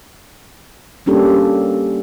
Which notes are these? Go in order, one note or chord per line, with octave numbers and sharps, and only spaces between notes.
G3 A#3 C#4 D4 G4 A4